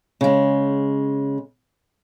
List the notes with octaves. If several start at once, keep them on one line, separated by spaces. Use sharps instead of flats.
C#3 G#3